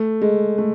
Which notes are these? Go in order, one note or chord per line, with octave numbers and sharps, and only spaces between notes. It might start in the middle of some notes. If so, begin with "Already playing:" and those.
Already playing: A3
G#3
A3